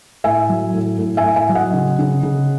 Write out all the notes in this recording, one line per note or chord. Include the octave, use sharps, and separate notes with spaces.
A2 E5 G#5
F#3
A2
A2
E5 G#5
A2
E5 G#5
F#3
D#5 F#5
C#3
C#3
C#3